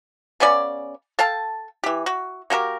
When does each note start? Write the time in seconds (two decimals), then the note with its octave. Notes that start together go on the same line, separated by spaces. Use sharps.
0.40 C#3 B3 C#4 D5
1.19 A4 F5 G5 A5
1.84 E3 G4
2.06 F#4
2.50 A#3 F#4 G4 A#4